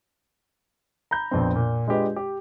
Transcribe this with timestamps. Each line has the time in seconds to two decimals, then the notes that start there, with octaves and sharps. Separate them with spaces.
1.11 A#5 B5 G6
1.31 A#1 F2 B3 C4
1.56 A#2
1.88 G#3 D4 F4 G4 B4 D#5
2.16 G4